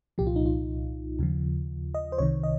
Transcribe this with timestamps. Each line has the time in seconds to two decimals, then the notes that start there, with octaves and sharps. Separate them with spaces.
0.18 C2 A#2 F3 G4
0.27 F4
0.36 D#4
0.46 F4
1.19 D#2 C#3 F3
1.95 D#5
2.12 C5
2.18 C2 C3 D#3 C#5
2.43 D#5